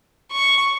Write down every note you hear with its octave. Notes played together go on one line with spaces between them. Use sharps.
C#6